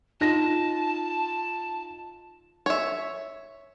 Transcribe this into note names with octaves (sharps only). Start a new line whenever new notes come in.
D#4 F4 A5 A#6
C#5 E5